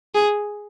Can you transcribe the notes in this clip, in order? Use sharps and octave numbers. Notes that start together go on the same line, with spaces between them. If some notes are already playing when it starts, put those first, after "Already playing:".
G#4